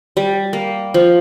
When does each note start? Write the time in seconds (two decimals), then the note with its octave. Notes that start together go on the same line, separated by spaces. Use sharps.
0.17 G3
0.53 A#3
0.94 F3